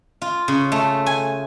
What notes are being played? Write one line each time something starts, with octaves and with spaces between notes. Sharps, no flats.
F4
C#3
A3
G#5